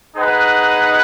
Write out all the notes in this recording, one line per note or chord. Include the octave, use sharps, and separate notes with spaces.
D#4 G#4 B4 F#5